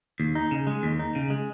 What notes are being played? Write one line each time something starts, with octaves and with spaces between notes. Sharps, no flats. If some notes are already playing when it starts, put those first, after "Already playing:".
D#2
D#4
C#3
G#3
D#2
D#4
C#3
G#3